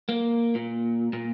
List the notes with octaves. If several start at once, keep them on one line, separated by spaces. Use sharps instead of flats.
A#3
A#2
A#2